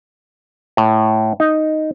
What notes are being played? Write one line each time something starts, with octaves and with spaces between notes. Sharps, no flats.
A2
D#4